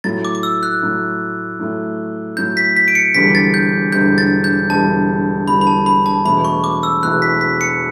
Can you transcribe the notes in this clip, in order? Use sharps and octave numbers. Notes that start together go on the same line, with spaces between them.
A2 F#3 A3 A6
D6
D6
E6
F#6
A2 F#3 A3
A2 F#3 A3
A2 F#3 A3 G6
B6
B6
D7
C#7
E1 E2 D3 G3 B6
A6
G6
E1 E2 D3 G3 G6
A6
G6
E1 E2 D3 G3 A5
E1 E2 D3 G3 B5
B5
A5
B5
A5
E1 E2 B2 A3 E4 B5
C#6
D6
E6
E1 E2 B2 A3 E4 F#6
B6
B6
C#7